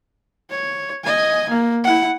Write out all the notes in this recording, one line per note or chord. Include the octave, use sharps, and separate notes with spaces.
C#5
D#5 G#5
A#3
E4 F#5